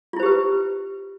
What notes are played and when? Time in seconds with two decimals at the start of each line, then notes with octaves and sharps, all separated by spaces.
0.13 F4
0.16 E4
0.20 C5
0.23 G4
0.26 B4